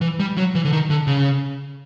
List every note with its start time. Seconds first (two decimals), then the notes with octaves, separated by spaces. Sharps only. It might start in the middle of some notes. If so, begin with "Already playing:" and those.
0.01 E3
0.20 G3
0.37 F#3
0.55 E3
0.65 D3
0.72 D#3
0.90 D3
1.07 C#3